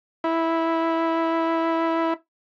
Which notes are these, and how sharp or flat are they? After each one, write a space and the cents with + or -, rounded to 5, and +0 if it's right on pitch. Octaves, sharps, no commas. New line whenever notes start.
E4 -5